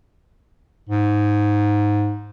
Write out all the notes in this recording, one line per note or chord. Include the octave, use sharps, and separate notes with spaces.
G#2